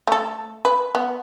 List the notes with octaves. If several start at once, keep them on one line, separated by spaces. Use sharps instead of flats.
A3 A4
B4
B3